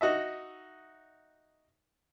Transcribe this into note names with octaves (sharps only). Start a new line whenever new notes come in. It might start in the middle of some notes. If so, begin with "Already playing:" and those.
D#4 F#4 D#5 E5